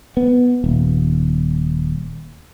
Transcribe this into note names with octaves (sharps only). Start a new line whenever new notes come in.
B3
D#1